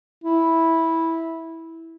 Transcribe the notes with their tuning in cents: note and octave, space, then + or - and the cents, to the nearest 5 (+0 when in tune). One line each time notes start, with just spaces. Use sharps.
E4 -10